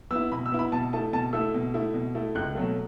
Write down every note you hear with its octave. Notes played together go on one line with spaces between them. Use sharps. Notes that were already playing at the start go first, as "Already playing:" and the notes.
B3 E4 E6
B2 B5
E6
B3 E4
B5
B2 A5
A3 E4 A5
B2 A5
A3 E4 E6
B2
A3 E4
B2
A3 E4
C#2 F#6
B2 F#3 A3